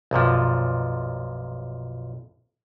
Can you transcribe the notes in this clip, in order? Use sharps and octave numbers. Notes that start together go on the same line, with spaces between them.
B1 F#2 A#2 F3